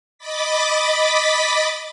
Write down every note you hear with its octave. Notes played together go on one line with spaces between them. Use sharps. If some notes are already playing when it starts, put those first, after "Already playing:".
D#5 B5 D6 A6 B6